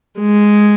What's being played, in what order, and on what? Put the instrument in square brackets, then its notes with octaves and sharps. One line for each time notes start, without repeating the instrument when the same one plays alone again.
[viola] G#3